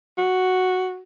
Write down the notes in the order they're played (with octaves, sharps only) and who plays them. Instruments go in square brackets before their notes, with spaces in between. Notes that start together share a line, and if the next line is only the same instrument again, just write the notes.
[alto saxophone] F#4